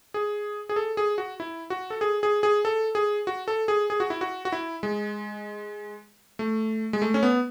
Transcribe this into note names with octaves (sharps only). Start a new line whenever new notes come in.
G#4
G#4
A4
G#4
F#4
E4
F#4
A4
G#4
G#4
G#4
A4
G#4
F#4
A4
G#4
G#4
F#4
E4
F#4
F#4
E4
G#3
A3
G#3
A3
C#4
B3